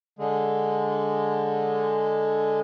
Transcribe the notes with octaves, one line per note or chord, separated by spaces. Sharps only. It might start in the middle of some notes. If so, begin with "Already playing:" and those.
D3 G#3